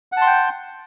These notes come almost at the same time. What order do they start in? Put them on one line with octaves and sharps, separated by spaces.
F#5 A5 C6 G5